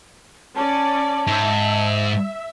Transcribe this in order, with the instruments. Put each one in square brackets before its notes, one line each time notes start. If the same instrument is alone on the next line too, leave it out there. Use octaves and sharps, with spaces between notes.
[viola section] C#4 D5 [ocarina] A5
[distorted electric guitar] G#2 [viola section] E5